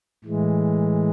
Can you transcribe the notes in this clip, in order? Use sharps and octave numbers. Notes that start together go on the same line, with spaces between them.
A2 E3 G#3